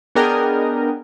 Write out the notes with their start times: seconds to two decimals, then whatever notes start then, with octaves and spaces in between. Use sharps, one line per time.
0.15 B3 D4 G#4 A#4 D#5 G5